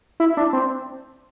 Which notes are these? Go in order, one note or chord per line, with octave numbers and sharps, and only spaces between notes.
E4
D4
C4